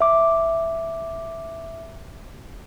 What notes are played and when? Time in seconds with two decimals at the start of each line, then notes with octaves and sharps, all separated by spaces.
0.01 E5 D6